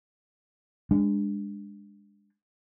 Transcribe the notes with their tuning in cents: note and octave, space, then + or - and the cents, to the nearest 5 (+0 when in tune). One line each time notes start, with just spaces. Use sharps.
G#3 -30 D4 +0